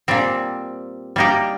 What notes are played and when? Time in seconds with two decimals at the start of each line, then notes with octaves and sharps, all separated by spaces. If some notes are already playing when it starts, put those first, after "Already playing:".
0.08 A#2 G3 C4
1.16 G3 A#3 D#4 G4